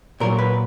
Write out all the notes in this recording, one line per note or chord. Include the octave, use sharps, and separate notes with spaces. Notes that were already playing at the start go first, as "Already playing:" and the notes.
A#2 F#3 A#4
B4